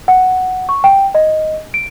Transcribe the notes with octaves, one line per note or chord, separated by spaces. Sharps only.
F#5
C#6
G5
D#5
D7